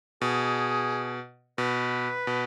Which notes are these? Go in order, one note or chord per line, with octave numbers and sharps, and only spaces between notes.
B2 G#4
B2 B4
B2